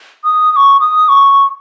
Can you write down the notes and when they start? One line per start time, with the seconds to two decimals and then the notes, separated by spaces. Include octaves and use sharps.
0.25 D#6
0.52 D#6
0.56 C#6
0.80 D#6
1.09 C#6